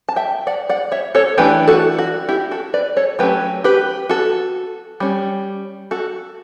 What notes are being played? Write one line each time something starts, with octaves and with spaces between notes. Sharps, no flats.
A5
E5 G5
D5 F#5
D5 F#5
C#5 E5
A4 C#5
E3 A3 D4 G4 B4
F#4 A4
F#4
E4 G4
F#4 A4
B4 D5
A4 C#5
F#3 A3 C#4 G4 B4
G4 B4
F#4 A4
G3 C#4
F#4 A4